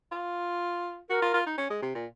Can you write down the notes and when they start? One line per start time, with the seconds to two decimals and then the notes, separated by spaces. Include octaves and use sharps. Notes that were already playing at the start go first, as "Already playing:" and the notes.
0.12 F4
1.09 F#4 A#4
1.22 F4
1.34 F4
1.47 D#4
1.58 C#4
1.70 G#3
1.82 C3
1.95 A#2